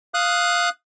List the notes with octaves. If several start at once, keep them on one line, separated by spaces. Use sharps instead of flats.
F5 D#6 F#6